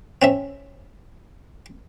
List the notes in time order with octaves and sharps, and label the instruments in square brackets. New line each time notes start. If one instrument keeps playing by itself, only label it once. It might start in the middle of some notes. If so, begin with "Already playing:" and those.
[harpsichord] C4 C#4 E5